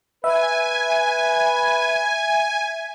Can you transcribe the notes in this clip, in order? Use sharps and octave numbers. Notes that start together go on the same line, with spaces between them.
B4 E5 G#5